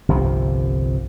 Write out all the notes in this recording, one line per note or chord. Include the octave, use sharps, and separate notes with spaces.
G1 C2 C3 F3